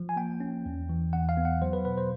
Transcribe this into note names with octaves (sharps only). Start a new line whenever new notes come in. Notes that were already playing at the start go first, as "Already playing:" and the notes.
Already playing: F3
G#5
A#3 G5
C#4
E2
E3
E2 F#5
F5
B3
F#5
F#3 C5
B4
B2 B4
C5